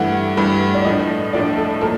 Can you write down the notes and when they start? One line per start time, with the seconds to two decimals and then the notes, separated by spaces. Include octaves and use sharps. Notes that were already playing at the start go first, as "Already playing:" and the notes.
Already playing: G2 E3 A3 F#5
0.37 G2 E3 A3
0.74 D5
0.85 A2 F3 A3 D4 D#5
1.33 A2 F3 A3 D4 D5
1.57 A4
1.81 A#2 F3 A#3 A4